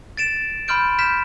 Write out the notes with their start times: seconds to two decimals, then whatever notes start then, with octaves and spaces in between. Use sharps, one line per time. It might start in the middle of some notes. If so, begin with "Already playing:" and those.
0.17 A6 D7 E7
0.68 B5 C6 F6 G6 D7
0.98 F6 G6 B6 E7